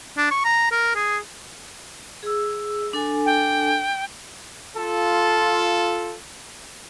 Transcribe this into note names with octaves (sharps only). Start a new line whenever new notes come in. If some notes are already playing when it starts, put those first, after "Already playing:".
D4
C#6
A#5
A#4
G#4
G#4 E6
D4 A4 G#5
G5
F4 A4